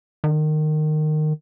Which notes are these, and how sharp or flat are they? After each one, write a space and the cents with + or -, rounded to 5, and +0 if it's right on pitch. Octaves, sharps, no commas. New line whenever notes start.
D#3 -20